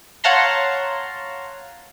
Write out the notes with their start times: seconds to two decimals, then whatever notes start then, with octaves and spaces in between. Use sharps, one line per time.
0.24 C#5 F5 F#5 A5 A#5 C6